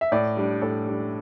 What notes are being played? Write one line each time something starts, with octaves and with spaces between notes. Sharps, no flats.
E5
A2 D5
G3 D4
A2 A4
G3 D4